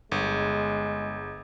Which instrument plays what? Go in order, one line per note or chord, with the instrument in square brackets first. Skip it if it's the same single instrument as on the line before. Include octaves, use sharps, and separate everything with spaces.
[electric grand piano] G1 [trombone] G#3